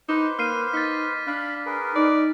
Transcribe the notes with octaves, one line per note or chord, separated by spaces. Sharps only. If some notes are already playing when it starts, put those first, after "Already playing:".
D#4 B4 C5 D6
A#3 F6 C7 D#7
D#4 A6 B6
D4 F5 B5
G#4 A#4 B4
D#4 D5